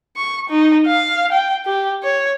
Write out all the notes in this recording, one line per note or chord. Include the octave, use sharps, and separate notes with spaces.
C#6
D#4
F5
G5
G4
C#5